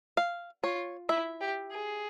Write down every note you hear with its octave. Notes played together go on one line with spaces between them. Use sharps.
F5
F4 C#5
E4 E5
G4
G#4